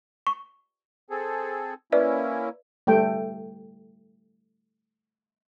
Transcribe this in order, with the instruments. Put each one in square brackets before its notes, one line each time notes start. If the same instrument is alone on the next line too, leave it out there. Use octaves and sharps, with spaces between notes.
[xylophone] C#6
[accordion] C4 G#4 A4
[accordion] A#3 C#4 E4 [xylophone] B4 D5 E5
[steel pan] G3 A3 A4 G5